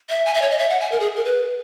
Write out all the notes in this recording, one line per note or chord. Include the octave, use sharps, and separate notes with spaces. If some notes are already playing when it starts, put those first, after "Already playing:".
E5
G#5
E5
C#5
D#5
E5
F#5
G#5
A#4
G#4
A#4
B4